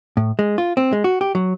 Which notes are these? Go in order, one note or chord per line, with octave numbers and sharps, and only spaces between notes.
A2
G#3
F4
C4
G#3
F#4
G4
F#3